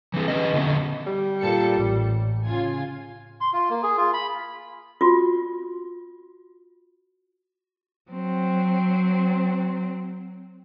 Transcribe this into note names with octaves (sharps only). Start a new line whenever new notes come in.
E3 C4
C#4 B4 D#5
D3 B3 C#4
G3
A#2 A4 C#7
A1
C#3 F4 G#5
C6
F4
A#3
G#4
F4
B5
F4 F#4
F#3 C4